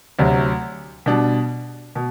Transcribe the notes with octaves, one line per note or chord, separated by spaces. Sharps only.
D2 C3 F#3
B2 G3 D4
B2